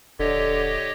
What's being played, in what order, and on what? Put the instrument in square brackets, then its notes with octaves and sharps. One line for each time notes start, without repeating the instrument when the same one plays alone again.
[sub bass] D#1 [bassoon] D3 [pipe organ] G4 C#5 D#5